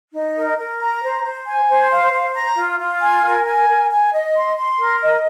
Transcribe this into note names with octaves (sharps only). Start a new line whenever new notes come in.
D#4
A#4
A#4
A#5
C5
C5
G#5
C5
F5
C5
A#5
F4
F4
G#5
A#4
G#5
A#4
G#5
D#5
C6
C6
A#4
D#5